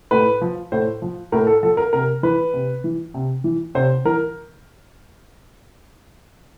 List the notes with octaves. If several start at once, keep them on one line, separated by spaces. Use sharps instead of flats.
A2 B4
F3
A2 C5
F3
A2 A#4
A4
F3 A4
A#4
C3 A#4
E3 B4
C3
E3
C3
E3
C3 C5
E3 A#4